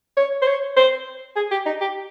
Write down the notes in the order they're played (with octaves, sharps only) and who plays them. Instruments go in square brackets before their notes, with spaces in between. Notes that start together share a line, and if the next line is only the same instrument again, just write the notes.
[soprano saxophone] C#5
C5
C#5
C5
G#4
G4
D#4
G4